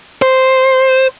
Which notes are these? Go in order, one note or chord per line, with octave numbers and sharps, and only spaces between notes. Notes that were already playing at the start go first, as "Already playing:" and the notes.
C5